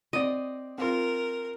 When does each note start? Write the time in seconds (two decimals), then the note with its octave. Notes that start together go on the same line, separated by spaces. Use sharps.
0.13 C4 D5 D#5
0.78 C4 F4 A#4